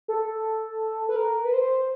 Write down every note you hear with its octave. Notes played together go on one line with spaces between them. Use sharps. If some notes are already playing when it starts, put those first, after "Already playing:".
A4
B4
A#4
B4
C5